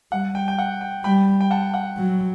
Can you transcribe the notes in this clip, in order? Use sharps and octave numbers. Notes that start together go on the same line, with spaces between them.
G3 F#5
G5
G5
F#5
G5
G3 G5 B5
G5
F#5 A5
F#5
F#3